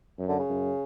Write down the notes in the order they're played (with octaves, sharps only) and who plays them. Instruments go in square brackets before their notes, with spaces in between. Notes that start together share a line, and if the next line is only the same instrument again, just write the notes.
[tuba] F#2
[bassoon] D3
C#3
[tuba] F#2